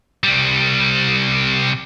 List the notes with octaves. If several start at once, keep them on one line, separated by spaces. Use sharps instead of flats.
C2 G3